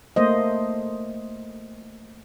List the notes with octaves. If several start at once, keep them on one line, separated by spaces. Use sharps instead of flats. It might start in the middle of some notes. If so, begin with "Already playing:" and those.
A3 A#3 C5 D#5